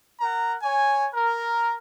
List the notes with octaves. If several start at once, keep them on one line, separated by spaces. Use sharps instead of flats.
A#4 F#5 A#5
C#5 G#5
A#4